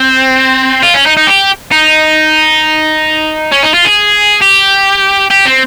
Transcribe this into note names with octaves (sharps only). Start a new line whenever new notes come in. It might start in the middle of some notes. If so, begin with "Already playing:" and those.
Already playing: C4
F4
C#4
D#4
D#4
G4
D#4
C#4
D#4
F4
G#4
G4
G4
C4